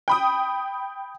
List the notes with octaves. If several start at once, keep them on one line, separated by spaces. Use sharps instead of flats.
G5 B5 D#6